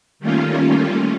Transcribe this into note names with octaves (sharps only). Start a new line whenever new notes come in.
D#3 G3 A3 A#3 C#4 F4